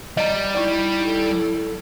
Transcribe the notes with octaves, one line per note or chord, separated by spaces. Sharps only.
G3 D#5 A#5
D#4 E4 D5 C#6
A4